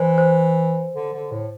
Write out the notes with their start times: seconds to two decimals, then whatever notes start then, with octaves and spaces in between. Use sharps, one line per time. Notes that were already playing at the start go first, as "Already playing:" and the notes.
Already playing: E3 C5
0.18 C5
0.96 D3
1.13 D3
1.31 A2